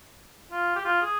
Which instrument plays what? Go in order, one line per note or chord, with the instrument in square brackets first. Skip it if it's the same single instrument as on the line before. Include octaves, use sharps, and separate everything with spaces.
[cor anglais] F4
G4
F4
G#4